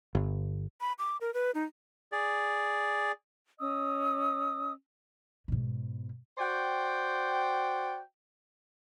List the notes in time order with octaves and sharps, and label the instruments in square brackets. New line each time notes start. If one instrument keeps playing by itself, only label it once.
[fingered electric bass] G1
[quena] B5
D6
A#4
B4
D#4
[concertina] G#4 D5
[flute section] C#4 D#5 D#6 E6
[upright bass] G#2 B2
[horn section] F#4 C5 D5 G5